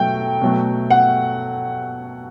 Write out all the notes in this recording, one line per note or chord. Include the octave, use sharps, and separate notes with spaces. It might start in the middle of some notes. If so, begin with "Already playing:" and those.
Already playing: B2 F#3 A3 G5
B2 F#3 A3
F#5